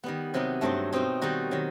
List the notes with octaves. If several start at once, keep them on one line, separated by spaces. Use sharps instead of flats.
D#3 G3 B3
C3 F#3 B3 D#4
G2 F#3 A3 C4 D#4
B2 A3 C4 D#4
D#3 G3 D#4 F#4
D#3 F#3